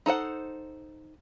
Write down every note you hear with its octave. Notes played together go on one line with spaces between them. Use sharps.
D#4 A4 C5 F#5